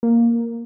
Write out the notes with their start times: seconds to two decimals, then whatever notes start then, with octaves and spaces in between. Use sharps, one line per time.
0.03 A#3